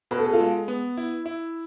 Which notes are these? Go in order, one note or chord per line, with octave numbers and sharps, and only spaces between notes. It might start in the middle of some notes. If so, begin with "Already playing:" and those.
B2 B4
A4
G#4
F4 A4
G#3
B3
E4
E4